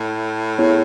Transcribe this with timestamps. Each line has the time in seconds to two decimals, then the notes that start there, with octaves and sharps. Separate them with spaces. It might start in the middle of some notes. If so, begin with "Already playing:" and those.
Already playing: A2
0.58 B3 E4 G#4 C#5